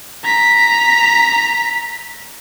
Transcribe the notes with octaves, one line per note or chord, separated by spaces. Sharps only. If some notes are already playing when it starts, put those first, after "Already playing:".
A#5 B6